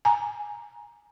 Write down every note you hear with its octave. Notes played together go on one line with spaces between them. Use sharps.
G#5 A#5